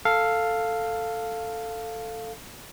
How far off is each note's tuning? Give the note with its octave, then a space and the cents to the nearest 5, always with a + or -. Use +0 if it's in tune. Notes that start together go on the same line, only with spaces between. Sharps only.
A4 +10 F5 +0